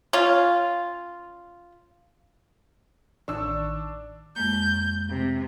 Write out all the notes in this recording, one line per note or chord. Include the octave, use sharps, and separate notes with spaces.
C#4 F4
A1 D#3 D4 C#6 E6
F2 G#3 A#3 G6
C3